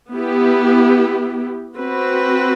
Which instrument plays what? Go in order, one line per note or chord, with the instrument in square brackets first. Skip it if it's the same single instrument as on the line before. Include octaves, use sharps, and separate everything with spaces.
[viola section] B3 E4 G4
C4 F#4 B4